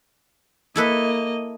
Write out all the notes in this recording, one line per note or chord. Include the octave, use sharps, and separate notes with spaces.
A#3 E4 A4 B4 D#5